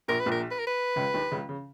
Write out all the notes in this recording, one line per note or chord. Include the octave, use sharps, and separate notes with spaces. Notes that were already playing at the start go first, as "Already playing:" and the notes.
A#1 A#2 A#4
B4
A#1 A#2
A#4
B4
A#4
B4
C#2 C#3
D#2 D#3
C#2 C#3
C#3